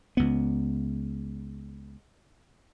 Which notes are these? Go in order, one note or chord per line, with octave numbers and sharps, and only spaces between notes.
C#2 B3